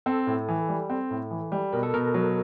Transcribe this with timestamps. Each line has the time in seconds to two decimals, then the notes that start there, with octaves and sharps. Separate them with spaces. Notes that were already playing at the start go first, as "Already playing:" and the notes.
0.06 C4 A4
0.27 A2
0.48 E3
0.69 G3
0.90 C4
1.11 A2
1.31 E3
1.52 G3
1.73 B2 A#4
1.83 A4
1.94 B2 A#4
2.14 F#3